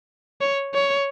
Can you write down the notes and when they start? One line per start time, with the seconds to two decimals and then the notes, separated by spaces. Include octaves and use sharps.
0.41 C#5
0.74 C#5